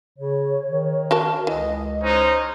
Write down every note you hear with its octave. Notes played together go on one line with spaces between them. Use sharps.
C#3 C#5
D#3
F#4 A#4 A5
C#2 E3 D#5
G#3 C#4 D#4 C5